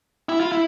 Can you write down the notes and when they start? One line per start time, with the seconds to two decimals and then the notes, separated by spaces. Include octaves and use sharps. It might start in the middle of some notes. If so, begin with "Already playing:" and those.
0.29 E4
0.40 F4
0.52 E4